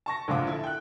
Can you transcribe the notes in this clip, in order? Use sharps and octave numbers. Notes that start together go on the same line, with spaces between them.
A5 C#6 A#6
A#1 D3 G#3 F4 F#5 D6
E4 A4
G5 F#6